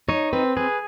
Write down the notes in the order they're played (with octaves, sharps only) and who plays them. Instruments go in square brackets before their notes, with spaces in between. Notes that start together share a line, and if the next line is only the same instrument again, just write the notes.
[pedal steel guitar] D#4 [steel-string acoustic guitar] C#5
[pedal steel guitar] C4 [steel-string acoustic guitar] B4
[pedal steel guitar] G#4 [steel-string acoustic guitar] B4